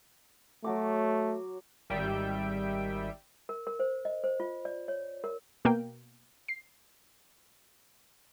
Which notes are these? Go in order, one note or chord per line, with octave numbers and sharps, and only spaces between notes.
F#3 A3 F#4 D6
G#1 D#3 G3 E5 G5 D7
A#4
A#4
C5
D#5
C5
F4
D5
C#5
A#4
B2 A#3 G5
C7